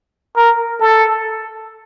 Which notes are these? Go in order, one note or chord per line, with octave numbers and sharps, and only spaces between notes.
A#4
A4